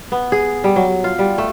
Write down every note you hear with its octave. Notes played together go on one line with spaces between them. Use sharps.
B3
G#4
G3
F#3
F4
G3
A3